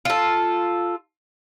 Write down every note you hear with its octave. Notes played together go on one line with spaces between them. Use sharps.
F4 A4